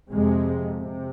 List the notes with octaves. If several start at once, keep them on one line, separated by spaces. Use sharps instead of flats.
F2 C3 G#3
C3